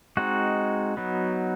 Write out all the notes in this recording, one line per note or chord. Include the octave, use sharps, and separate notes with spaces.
G#3 C4 D#4 F#4
F#3 B3 D#4